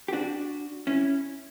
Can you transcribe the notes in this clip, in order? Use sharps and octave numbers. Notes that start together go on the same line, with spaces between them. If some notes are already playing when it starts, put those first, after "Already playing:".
G4
D4 F#4
C#4 E4